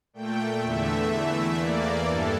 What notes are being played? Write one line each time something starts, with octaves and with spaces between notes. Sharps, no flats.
A#2 A3 G5
E2 D3 A3 E5
E2 E3 A3
E2 E3 A#3 D5
G2 E3 A4